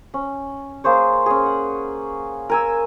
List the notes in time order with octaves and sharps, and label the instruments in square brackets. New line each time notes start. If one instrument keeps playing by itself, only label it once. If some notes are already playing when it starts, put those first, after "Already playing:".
[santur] C#4
A#3 G#4 C5 C#5
C#4 G#4
F#5
A#4 G#5 E6